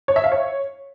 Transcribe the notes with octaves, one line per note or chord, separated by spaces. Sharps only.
C#5
E5
F5
C#5